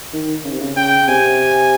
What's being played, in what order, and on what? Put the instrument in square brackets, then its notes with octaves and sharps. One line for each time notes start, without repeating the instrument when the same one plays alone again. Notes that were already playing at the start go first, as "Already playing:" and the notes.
[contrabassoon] D#3
C#3
C3
C#3
[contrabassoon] C#3 [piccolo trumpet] G5
[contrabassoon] C3 [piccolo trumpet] G#5